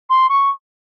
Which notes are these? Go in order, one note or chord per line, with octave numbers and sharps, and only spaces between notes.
C6
C#6